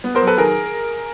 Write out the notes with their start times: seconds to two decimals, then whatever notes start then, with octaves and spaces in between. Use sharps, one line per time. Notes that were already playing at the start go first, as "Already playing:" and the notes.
0.04 B3
0.15 A#4 C5
0.22 F#3
0.27 A4 B4
0.38 D#3 G#4 A#4